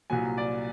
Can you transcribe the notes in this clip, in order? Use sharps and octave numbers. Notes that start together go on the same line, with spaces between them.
C2 A#2 F#3 G#5
D5